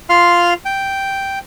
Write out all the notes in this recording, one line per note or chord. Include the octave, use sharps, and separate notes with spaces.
F4 F5 C6 F6
G5